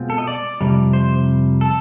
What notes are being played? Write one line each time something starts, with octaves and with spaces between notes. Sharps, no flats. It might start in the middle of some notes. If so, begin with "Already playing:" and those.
Already playing: B2 G#3 C4 F4
A4
D#5
D5
F2 C3 G3
C5
A4